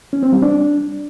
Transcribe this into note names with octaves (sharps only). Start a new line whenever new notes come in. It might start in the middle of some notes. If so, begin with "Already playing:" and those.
C#4
C4
G3
D4